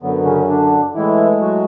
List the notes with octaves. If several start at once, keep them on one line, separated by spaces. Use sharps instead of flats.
F#2 D3 F#3 B3
C#3 C#4
D3 D4
A2 E3 G#3 E4
F#3 F#4